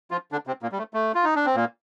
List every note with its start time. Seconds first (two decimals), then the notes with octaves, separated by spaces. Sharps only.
0.11 F3 F4
0.32 D3 D4
0.47 C3 C4
0.62 A#2 A#3
0.72 G3
0.78 A3
0.94 A3
1.15 F4
1.24 D#4
1.36 D4
1.45 C4
1.55 A#2 A#3